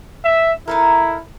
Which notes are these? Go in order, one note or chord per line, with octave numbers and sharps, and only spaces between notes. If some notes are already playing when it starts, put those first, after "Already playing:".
E5
D#4 E4 A4 A#4